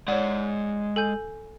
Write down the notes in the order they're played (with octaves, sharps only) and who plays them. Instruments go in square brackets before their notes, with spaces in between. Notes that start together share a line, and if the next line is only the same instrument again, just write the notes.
[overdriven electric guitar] G#3 F#5 [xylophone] C#5 D5
[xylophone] A4 G#5 G6